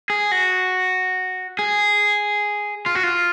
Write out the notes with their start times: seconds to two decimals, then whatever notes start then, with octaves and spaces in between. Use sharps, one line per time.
0.10 G#4
0.32 F#4
1.59 G#4
2.86 F4
2.95 F#4
3.03 F4